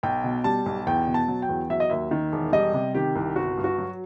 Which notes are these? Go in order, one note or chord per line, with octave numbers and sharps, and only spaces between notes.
B1 G5
B2
G3 A5
B1
E2 G5
B2
A5
F#3
G5
E2
F#3 E5
D#5
D#2 E5
D#3
E1
G3 D#5
C3
D#3 G4
C2
G1 F#4
G2
F#4
F#3